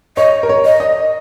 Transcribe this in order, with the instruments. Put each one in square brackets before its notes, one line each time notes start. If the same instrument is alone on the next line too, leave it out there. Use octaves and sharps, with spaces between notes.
[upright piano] C#5 [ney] D#5
[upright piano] A#4
C#5
[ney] D#5
[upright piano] D#5